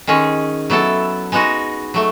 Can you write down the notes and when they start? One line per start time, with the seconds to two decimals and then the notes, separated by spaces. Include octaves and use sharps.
0.07 D#3 G#3 C#4 G#4
0.70 F#3 B3 E4 A4
1.32 G#3 B3 D#4 F#4
1.94 F#3 A3